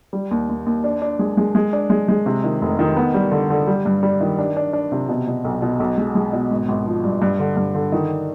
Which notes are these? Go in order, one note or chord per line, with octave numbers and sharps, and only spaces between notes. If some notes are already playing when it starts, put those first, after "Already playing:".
G3
D#2
D#2
D#2
D4
D4
G#3
G#3
G#3
D4
G#3
G#3
C3
D#3
F1
D#3
B3
G3
D3
D3
G3
G2
G3
D#3
D4
D4
D4
C3
B2
B2
B1
B2
B1
G#3
G#3
B2
G#1
G#1
F3
G2
G2
D3
G2
D3
D#3